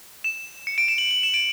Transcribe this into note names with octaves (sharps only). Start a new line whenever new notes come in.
E7
C#7
D7
E7
F#7
F#7
E7
D7